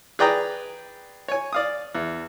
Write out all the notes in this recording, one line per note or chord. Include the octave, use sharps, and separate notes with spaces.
G#4 B4 D5 G5 A#5 D#6
C#5 G#5
D5 F5 D#6
E2